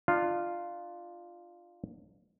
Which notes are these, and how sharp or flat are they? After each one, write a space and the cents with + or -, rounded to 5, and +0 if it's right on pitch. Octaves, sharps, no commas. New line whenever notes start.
D4 +30 F4 +0